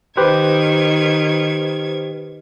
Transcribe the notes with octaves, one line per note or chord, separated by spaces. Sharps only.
D#3 G4 B4 C5 G#6